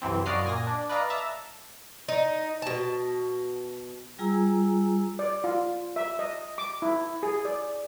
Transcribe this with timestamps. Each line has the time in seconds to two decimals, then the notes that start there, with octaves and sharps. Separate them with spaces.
0.02 C2 F#2 E3 C4
0.25 F#2 F#4 D5 D#5 F5 C7
0.45 A#2 G#5 A#6
0.67 D4
0.89 B4 D5 D#5 F5 A#5
1.10 E5 A5 A#5
2.08 D#4
2.62 B2 A5
4.19 G3 F4 G#4 G#5 A#5 E6
5.19 D5
5.44 F4
5.96 E5
6.19 D#5
6.58 D6
6.82 E4
7.23 G#4
7.45 D5